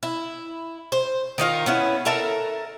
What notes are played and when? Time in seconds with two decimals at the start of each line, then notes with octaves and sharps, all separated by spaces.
0.03 E4
0.92 C5
1.38 D#3 D#4 F4 A#4
1.66 B3 C#4 E4
2.05 A4 A#4 E5 A#5